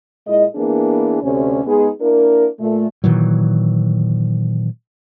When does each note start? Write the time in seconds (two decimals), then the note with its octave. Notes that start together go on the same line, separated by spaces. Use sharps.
0.26 A#2 G#3 E4 D#5
0.55 E3 A#3 B3 D4 G#4
1.22 D2 C3 C#4
1.65 G#3 B3 D#4 G#4
2.01 A#3 D4 E4 A#4
2.59 A#2 A3
3.04 A#2 D#3 E3 F#3